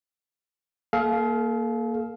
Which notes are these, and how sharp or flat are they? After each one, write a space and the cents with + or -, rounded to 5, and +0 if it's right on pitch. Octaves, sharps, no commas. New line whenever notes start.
A#3 +0 A4 -45 F5 +0